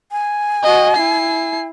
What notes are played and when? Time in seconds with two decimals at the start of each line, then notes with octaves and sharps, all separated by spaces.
0.12 G#5
0.63 F#4 D#5
0.96 E4 C7